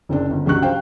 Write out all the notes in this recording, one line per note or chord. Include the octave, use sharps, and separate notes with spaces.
F#1 C4 D4
G1
C#2 G2 F#3 G4 C#6 F#6
C5 F5 G5